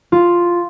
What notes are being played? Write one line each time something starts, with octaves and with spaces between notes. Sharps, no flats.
F4